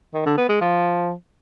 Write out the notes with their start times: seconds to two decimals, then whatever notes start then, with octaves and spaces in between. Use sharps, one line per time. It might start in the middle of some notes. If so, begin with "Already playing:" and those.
0.14 D#3
0.26 D3
0.37 B3
0.49 G#3
0.61 F3